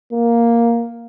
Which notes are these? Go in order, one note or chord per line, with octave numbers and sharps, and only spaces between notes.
A#3